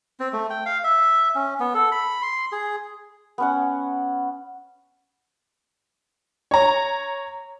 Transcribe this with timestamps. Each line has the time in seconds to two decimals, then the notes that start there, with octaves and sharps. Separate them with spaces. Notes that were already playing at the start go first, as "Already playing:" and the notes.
0.20 C4
0.33 A3
0.50 G5
0.66 F5
0.84 E5
1.35 C#4
1.60 B3
1.75 A4
1.92 B5
2.22 C6
2.52 G#4
3.38 B3 C#4 F#5
6.51 C#5 A#5